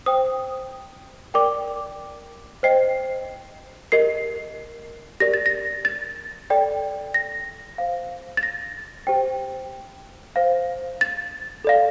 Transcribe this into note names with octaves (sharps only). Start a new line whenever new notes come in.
C5 G5 D#6
A#4 D5 G5 D6
C5 D#5 G5 C7
G4 A#4 D#5 C7
G4 A#4 D5 A#6
A6
A#6
A6
A4 D5 G5
A#6
C5 F5
A6
A#6
G4 C5 G5
C5 F5
A6
A4 D5 F5